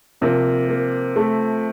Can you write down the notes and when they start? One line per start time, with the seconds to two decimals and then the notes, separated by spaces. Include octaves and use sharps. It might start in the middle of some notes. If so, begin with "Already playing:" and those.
0.21 C3 F3 A#3
0.69 A#3
1.16 A3